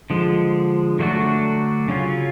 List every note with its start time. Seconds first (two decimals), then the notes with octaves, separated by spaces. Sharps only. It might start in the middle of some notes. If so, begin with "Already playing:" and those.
0.10 D3 F3 G#3
0.99 D3 F#3 A3 D4 F#4
1.88 C#3 F#3 C#4 F4